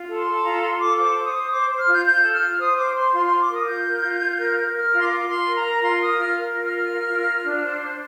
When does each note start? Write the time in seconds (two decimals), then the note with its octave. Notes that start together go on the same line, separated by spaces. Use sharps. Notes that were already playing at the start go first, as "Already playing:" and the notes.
Already playing: F4
0.09 A4
0.17 C6
0.26 A4
0.43 F4 A#5
0.61 F4 C6
0.73 C6
0.80 A4 D6
0.97 C5 D6
1.16 C5
1.24 D#6
1.34 C5
1.51 C5 D6
1.70 C5
1.78 F6
1.87 F4
1.93 G6
2.06 F4 G6
2.23 A4
2.33 F6
2.41 F4
2.59 C5 D#6
2.77 C5 D6
2.95 C5 C6
3.13 F4 C6
3.26 F4 C6
3.40 D6
3.49 A#4 D#6
3.67 F4 G6
3.84 A#4
4.03 F4
4.21 F4
4.38 A#4
4.57 A#4
4.74 A#4 F6
4.93 F4 C6
5.01 D6
5.11 F4
5.28 F4 C6
5.47 A#4
5.55 A#5
5.65 A#4
5.82 F4 C6
6.00 A#4 D#6
6.19 F4 F6
6.36 A#4
6.55 F4
6.63 F6
6.73 A#4
6.91 A#4
7.08 F4
7.26 F4
7.44 D4
7.62 C5
7.80 D4